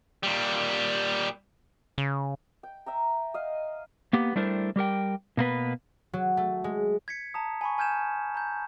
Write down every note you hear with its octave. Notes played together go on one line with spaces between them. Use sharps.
A#2 G3
C#3
G5
E5 G5 A#5
D#5 F5
A#3 B3 G4
G3 A3 D4 E4 A#4 C5
G3 G4 A#4 G5
B2 A#3 B3 B4
F#3
A3
G#3
G#6 B6 C#7
A5 A#5 D#6
G#5 B5 C#6
G#5 F6 G6 G#6 E7
A#5 G6